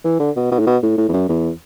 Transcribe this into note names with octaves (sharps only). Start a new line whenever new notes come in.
E3
D3
B2
B2
A2
B2
A2
A2
E2
F#2
E2